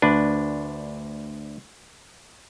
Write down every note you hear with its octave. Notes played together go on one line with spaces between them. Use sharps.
D2 D4 B4